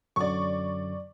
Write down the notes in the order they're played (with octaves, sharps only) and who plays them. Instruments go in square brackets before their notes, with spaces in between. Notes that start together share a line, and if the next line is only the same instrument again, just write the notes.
[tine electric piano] F#2 D3 F#3 [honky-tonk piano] D5 C#6